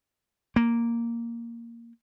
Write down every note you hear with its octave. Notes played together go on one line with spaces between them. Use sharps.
A#3